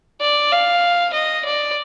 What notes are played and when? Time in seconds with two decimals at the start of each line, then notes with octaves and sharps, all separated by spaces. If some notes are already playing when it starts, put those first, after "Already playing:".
0.21 D5
0.52 F5
1.13 D#5
1.45 D5